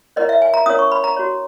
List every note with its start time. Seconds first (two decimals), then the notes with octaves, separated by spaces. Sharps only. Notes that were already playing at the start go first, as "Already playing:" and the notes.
0.16 E4 A#4 C#5 D#5
0.29 E5
0.42 G#5
0.54 A#5
0.66 C#4 E4 A#4 C#5 D#6
0.79 C#6
0.92 B5
1.04 A#5
1.17 F#4 C#5